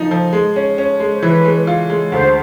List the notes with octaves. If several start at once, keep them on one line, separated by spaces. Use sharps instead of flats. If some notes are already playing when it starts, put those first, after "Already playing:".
Already playing: F3 D#4
F3
G#3
C#4
C#4
G#3
C5
E3 B4
G#3
F4
G#3
D2 C5